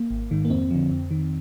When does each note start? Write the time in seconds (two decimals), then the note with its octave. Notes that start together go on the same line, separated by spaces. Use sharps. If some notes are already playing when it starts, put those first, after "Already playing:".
Already playing: A#3
0.10 G#1
0.31 G#2 D#3
0.45 A#3
0.50 F2 C4
0.71 D3 F3
0.90 F2
1.11 D#3